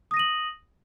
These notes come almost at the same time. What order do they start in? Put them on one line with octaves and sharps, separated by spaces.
D#6 A#6 D#7 F#7